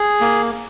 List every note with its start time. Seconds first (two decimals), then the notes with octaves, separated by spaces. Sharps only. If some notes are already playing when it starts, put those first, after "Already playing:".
Already playing: G#4
0.21 A#3